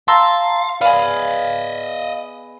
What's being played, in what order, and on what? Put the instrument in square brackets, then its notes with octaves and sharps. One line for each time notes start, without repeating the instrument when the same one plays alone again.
[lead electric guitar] F5 [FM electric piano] A5 A#5 [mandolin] C6 E6
[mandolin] B3 G#4 [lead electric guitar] D5 D#5 [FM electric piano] F5